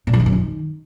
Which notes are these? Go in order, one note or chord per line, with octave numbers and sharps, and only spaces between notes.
A#2
F3
D#3
F#2
D#3